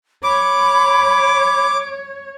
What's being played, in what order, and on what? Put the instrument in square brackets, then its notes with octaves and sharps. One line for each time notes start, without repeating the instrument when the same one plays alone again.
[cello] C#5 [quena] B5 [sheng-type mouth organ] D6